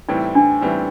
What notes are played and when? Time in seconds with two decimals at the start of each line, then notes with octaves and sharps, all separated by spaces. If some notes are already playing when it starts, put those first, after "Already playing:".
0.08 A2 E3 G3 C4 D#4
0.35 D4
0.61 A2 E3 G3 C4 D#4